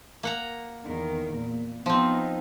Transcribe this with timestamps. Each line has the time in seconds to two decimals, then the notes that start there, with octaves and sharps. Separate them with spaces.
0.23 A#3 F#5 A#5
0.84 E2 D#3 A#4
1.38 A#2
1.86 F3 B3 C4 D#4